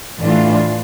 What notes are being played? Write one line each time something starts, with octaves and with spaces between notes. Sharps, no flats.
A2 E3 A3 D4 F4